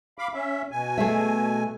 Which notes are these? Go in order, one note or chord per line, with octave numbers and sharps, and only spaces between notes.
F5 B5 D6
C#4 E5
B2 G#5
A3 G#4 E5